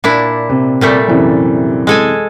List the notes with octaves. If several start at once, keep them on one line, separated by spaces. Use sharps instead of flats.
A#2 D4 E4
C3
A#2 G3 A3
F#2 C3 E3
G#3 A4 G#5